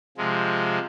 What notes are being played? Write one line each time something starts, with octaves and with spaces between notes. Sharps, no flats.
C3 F3 G#3